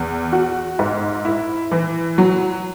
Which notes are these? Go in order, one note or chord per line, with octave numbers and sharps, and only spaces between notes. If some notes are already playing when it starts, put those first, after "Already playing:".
Already playing: E2
F#4
G#2
E4
E3
F#3